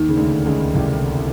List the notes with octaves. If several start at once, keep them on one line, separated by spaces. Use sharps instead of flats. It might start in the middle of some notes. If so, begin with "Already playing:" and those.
Already playing: D#2 D#3
C#3
D2 D3
C#2 C#3
C2 C3